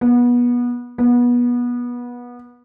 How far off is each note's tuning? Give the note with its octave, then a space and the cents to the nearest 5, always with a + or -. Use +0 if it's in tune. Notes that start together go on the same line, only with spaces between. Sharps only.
B3 -25
B3 -25